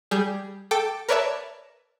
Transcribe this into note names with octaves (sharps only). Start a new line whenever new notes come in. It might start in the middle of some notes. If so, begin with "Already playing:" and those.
G3 G#4 G6
A4 G5 D6
A#4 B4 C#5 D5 E5 A5